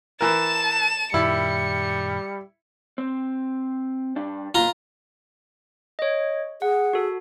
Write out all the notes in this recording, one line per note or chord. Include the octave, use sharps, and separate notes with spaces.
E3 A#4 A5 E7
F#2 A#2 D#3 G3 E4 C#7
C4
G2 D4
B1 E3 A#3 F4 A#5
C#5 D#5
G#4 F#5
F#4 A4